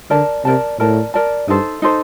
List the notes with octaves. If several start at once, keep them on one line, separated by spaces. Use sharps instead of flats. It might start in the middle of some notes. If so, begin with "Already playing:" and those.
D3 A#4 D5 A5
C3 A#4 D5 A5
A2 A#4 D5 A5
A#4 D5 A5
G2 D#4 A4 C5
D#4 A4 C5